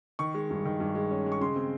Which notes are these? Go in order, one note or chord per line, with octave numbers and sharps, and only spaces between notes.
D#3 C#6
G#3
G2
D#3
G2
G#3
C#4
G#3
C#6
C#3 C6
C4